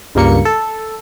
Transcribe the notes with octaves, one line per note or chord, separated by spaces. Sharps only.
C#2 G2 A#3 C#7
A4